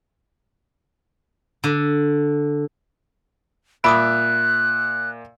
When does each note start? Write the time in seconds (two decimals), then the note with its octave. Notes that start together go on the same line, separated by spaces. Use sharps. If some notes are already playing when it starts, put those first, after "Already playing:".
1.64 D3
3.84 A#2 E5 B5 D6 D#6 F#6 D7